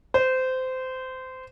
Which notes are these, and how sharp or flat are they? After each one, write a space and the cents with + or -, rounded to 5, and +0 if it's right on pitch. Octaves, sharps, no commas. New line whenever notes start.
C5 -20